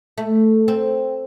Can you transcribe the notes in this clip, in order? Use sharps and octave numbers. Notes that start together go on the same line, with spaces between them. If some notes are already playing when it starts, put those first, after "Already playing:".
A3
C4